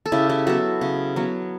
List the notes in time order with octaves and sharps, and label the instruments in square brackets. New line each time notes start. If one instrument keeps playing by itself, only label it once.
[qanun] A4
C#3 E4 G4
E4 G4
F#3 B3 F#4 A4
C#3
F#3 B3